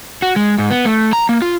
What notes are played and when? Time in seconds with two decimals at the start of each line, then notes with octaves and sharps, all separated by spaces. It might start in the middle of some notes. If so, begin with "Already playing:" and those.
0.22 F#4
0.36 G#3
0.58 G#2
0.71 B3
0.85 A3
1.13 A#5
1.29 A#3
1.42 F4